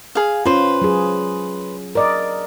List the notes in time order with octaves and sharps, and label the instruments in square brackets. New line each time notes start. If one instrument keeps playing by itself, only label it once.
[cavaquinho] G#4 F5
[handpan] C#4 F4 [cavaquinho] B4 C5
[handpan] F#3 G#4
A#4 D5 D#5